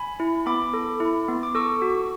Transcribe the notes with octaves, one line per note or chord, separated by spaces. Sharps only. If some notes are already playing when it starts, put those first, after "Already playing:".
Already playing: G#5 B5
E4
B3 B5 D6
A4
E4
B3
D6
A4 C#6 E6
F#4